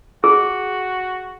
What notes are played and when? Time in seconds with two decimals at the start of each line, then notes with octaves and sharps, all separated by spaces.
0.24 F#4 G#4